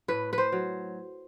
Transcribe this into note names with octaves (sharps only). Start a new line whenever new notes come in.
A2 B4
B4
C5
F#3